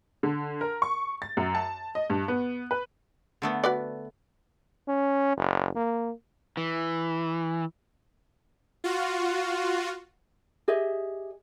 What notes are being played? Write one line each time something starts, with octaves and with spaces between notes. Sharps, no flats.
D3
A#4
C#6
A6
F#2
A5
D#5
G2
B3
B4
D3 A3 B3
F#4 B4 D5
C#4
F#1
A#3
E3
F4 F#4
G4 G#4 D#5 E5